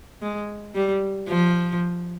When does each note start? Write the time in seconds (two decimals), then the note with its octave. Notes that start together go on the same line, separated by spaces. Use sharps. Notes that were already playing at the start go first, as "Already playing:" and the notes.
0.22 G#3
0.75 G3
1.28 F3